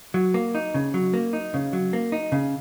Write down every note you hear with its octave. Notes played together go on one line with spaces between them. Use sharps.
F#3
A#3
D#4
C#3
F#3
A#3
D#4
C#3
F#3
A#3
D#4
C#3